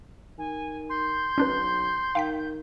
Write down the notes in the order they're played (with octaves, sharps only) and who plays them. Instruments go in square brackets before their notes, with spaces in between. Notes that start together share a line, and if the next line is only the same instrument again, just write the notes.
[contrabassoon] D#3 [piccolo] G#5
[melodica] C6 [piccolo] G6
[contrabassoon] B1 [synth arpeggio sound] C#4 D4 B4
[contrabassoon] D#3 [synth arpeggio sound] F5 G5 B6